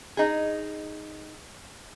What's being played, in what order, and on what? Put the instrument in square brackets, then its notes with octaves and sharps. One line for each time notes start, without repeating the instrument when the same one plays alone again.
[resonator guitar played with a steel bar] D#4 G#4